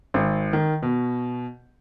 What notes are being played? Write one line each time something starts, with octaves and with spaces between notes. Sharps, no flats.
G#1
D#3
B2